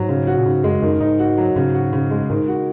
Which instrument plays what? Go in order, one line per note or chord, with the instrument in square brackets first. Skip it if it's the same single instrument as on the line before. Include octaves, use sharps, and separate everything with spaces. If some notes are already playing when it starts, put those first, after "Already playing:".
Already playing: [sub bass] G#2 [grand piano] F#3
[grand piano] C#3
F#4
[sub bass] A#2
[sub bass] G#2 [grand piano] C#3
[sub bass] F#2 [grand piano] G#3
[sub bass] F#2 [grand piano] D#3
[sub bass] G#2 [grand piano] D#4
[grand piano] F#4
F#3
[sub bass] G#2 [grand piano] C#3
[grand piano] F#4
C#3
G#3
[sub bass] G#2 [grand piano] D#3
[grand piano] F#4